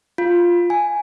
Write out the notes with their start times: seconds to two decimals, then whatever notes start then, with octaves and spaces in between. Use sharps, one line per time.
0.18 F4
0.70 G#5